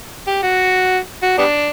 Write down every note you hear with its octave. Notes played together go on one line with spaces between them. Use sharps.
G4
F#4
F#4
G3 B3 D4